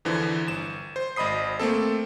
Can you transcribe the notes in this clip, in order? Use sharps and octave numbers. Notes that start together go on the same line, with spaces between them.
E2 D3 E3 F3
G1 E7
C5
G#1 D#5 B5 D#6 C7
A3 A#3 C4 A4